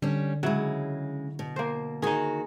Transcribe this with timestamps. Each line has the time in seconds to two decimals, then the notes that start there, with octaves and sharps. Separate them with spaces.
0.02 D3 G3 C#4
0.43 C#3 F#3 G#3 E4
1.39 B2
1.56 A#3 C5
2.02 D#3 D#4 F#4 G#4